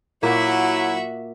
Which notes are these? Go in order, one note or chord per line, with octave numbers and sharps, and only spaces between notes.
A#2 F#3 A#3 E4 F#4 E5